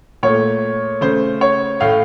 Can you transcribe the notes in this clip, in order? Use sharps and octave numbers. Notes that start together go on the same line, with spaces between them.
A#2 A3 C#5
C#3 A3 C5
C#5
A2 A3 F5